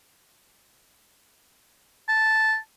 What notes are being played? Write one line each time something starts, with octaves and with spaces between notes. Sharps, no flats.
A5